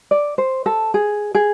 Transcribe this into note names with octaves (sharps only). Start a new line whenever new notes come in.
D5
C5
A4
G#4
G#4